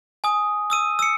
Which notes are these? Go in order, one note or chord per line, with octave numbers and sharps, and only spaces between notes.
G#5 D#6
D#6 E6 D#7
E6 C#7